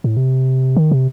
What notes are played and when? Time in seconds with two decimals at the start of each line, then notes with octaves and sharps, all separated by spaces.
0.04 A2
0.17 C3
0.76 D#3
0.92 C3